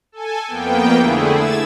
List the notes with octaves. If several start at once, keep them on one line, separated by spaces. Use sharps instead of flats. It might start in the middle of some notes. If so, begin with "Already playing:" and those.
A4 G#5
F2 A#3 B3 G5
D3 A3 E4 G#4
E6 G#6 A6 E7